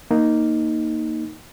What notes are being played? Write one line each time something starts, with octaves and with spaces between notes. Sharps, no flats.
A#3 D#4